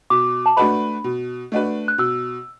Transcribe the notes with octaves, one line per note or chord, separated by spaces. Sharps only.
B2 D6
A5
A3 D4 F#4 B4 B5
B2
A3 D4 F#4 B4
F#6
B2 E6